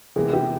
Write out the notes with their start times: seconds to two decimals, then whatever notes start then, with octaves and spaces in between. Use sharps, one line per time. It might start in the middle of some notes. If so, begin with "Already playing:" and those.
0.16 C3 E3 G#3 B3 G#4
0.33 G4